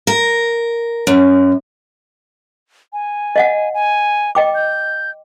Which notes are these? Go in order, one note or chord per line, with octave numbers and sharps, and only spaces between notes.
A#4
F#2
G#5
D#5 F5 F#5
G#5
D#5 G5 D6
G6